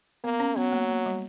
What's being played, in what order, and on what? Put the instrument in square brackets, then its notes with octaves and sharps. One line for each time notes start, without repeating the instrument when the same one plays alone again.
[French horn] A#3 [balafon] B3
[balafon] C#4
[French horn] F#3 [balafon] B3
[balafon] A#3
A#3
G3